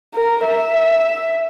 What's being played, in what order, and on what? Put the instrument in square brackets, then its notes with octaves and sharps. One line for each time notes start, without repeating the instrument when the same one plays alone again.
[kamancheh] A#4
E5